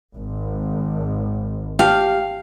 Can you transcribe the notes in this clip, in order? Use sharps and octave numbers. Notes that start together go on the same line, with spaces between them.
G#1
G4 F5 A5